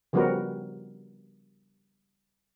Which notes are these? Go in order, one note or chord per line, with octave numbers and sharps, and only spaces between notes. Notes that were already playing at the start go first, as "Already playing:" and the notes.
C#3 F3 G3 B3 F#4 A#4